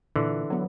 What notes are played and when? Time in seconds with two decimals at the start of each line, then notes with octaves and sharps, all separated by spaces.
0.16 A#2 D3 E3
0.50 F#3 B3